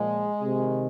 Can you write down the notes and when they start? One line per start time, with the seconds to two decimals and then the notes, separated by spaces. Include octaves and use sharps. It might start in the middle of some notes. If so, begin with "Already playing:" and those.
Already playing: A#2 F3 G#3
0.42 C3 D#3